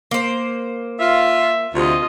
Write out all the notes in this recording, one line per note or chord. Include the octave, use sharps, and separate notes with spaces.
A#3 C5
F4 E5
D2 C3 F4 D#5